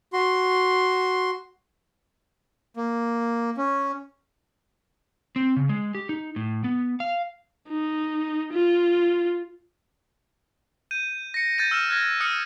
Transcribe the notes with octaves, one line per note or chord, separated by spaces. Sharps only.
F#4 C6
A#3
C#4
C4
C#3
G#3
G4
D#4
A2
B3
F5
D#4
F4
G6 D#7
A#6 C#7
G6 A6 C#7 D#7
E6 F6 G6 E7
F6 F#6 G#6 A#6
D#6 F6 C#7 D#7